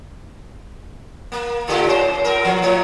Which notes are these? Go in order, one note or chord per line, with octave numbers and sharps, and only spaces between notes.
A#3
A2 D3 G4
C#4 C5
B3 A#4
F3
A2 C#5